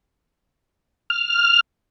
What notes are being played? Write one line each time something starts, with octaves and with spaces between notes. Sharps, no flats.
F6